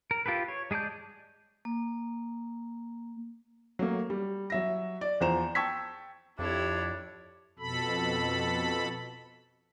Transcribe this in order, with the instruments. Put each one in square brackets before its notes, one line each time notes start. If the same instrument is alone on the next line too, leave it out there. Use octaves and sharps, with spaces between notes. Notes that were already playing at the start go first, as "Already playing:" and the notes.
[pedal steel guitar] A#4
F4 G4 A4 B4
C#5
G#3 G#4 D5 A5 G6
[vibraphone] A#3
[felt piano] F#3 A3 A#3
G3
F#3 E5 A#6
D5
E2 F3 C5 A#5 E7
G5 A5 C#6 E6 G#6 B6
[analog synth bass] F2 [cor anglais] D4 [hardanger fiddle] E4 C#5 [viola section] G4
[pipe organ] F2 B2 A4 B5